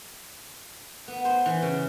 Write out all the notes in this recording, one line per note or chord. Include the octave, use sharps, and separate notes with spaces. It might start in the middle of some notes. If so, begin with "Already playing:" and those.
B3
C5
E3
C#3